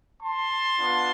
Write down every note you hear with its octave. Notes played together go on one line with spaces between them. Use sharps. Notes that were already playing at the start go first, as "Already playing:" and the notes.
A5 C6
B3 D4 F4